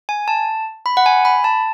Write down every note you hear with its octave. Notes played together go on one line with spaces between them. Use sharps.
G#5
A5
B5
F#5
G#5
B5
A5